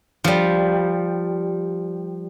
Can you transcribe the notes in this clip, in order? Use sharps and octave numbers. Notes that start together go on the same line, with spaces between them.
F3 G3